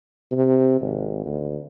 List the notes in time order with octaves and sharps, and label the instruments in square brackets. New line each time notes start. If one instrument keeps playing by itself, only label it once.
[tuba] C3
G#1
D2